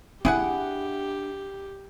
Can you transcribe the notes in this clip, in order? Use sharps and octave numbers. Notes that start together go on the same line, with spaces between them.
D4 E4 G4 G#4 F#5